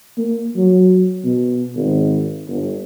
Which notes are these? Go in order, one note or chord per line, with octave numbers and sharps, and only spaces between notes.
A#3
F#3
B2
G#1
G1